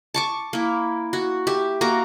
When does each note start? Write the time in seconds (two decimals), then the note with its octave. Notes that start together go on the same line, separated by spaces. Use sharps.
0.14 A5 C#6 D6
0.53 A#3 E4
1.13 F#4
1.47 G4 E5
1.81 A#3 F#4 A#5